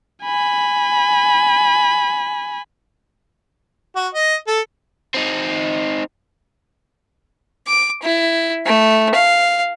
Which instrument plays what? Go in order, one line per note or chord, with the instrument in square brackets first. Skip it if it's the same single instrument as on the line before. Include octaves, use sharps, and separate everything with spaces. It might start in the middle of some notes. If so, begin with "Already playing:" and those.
[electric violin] G#5 B5
[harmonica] F#4
D#5
A4
[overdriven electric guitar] C4 D#4
[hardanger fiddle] D6
E4
A3
F5